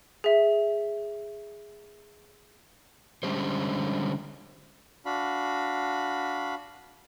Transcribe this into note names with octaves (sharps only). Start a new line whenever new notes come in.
G#4 E5
D3 G3 G#3 C#4 G4 C5
D4 F#4 F5 B5